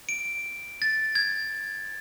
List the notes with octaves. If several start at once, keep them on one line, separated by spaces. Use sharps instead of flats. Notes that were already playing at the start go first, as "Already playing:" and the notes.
D7
A6
G#6